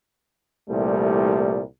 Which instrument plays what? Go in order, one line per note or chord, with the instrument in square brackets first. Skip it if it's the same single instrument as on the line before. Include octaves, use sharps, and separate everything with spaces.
[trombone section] C2 A#2 E3 G3 A3